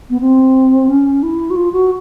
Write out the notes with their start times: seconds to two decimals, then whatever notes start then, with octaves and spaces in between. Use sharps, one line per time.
0.10 B3
0.21 C4
0.88 C#4
1.23 E4
1.50 F#4
1.56 F4
1.73 F#4